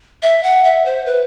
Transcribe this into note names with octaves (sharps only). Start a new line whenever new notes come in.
E5
F#5
E5
C5
B4